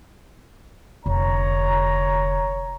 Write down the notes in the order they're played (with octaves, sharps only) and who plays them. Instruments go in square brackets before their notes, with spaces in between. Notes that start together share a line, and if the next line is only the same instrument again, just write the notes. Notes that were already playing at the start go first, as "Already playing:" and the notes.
[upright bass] F1 D3 [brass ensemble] C#5 A#5